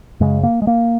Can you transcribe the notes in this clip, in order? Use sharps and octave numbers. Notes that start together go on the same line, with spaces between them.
F#2 C#3 G#3
A#3
G#3
A#3